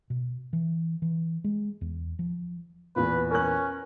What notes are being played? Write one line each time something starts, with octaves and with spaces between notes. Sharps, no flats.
B2
E3
E3
G#3
E2
F3
E2 A#2 B4
C#4 A#4 F#6